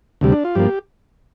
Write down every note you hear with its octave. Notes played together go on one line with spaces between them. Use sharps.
D2 C3 G3
D4
F4
G2 F3 A#3 G4